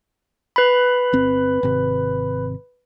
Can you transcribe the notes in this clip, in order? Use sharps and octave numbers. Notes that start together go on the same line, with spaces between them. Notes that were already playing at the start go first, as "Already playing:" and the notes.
B4 B5
G1 C4
G#1 C3